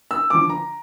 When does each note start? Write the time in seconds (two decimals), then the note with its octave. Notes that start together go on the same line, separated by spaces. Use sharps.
0.11 E6
0.30 D3 F3 D6
0.50 A#5